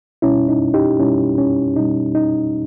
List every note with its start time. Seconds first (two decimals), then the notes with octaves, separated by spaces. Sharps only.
0.22 B2 G3 C#4 E4
0.49 D#4
0.74 D#4 G4
0.99 B2 G3 C#4 E4
1.38 C#4
1.76 B2 G3 D#4
2.15 D#4